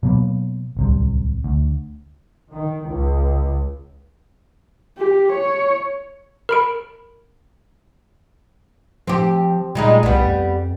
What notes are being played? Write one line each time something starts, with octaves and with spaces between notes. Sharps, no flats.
B2 F#3 A#3 B3
D1 C2 C3
D2
D#3
C#2
G4
C#5
A#4 B5 D7
F3 C4 G4
A#2 G3 G#3 D#4
C2 G3 B3
F2